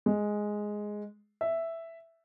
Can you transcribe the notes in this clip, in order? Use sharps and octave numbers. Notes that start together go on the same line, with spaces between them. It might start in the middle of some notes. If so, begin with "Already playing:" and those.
G#3
E5